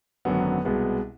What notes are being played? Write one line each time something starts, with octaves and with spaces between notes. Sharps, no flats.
G#1 F#2 D3 F#3 B3
C2 B2 G#3 B3